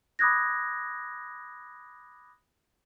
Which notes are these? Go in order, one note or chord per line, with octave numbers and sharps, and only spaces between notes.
B5 D6 D#6 F#6 G#6 A#6